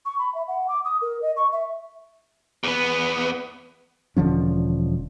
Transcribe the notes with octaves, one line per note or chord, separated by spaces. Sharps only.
C#6
B5
E5
F#5
D6
D#6
A#4
D#5
C#6
E5
E2 B3
E1 D3 F3 C#4